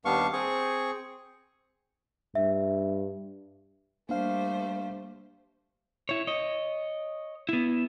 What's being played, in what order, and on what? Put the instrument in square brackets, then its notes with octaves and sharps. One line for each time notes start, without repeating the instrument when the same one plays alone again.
[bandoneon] D#2 G3 B3 D4 F5 C#6
C4 G#4 C#6
[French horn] G2 [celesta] E5
[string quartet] G3 A3 C5 [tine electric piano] A#3 D4 F5
[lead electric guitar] E4 C#5
C#5 D#5
B3 E4